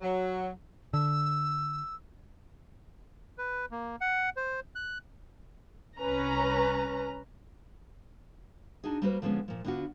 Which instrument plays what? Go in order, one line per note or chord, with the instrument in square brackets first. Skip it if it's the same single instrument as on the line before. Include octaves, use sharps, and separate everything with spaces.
[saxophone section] F#3
[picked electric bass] D3 [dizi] E6
[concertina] B4
A#3
F#5
C5
F#6
[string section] C2 C#4 B4 A#5
[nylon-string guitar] D4 D#4 F#4 G#4
G3 A#3 F#4 B4 C5
D3 F3 G#3 B3 C#4
A#2 F3
D3 B3 D4 F4 F#4